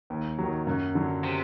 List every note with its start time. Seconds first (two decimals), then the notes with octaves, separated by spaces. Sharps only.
0.10 D#2
0.38 D#3 F#3
0.67 F#2
0.95 D3 F#3
1.24 C3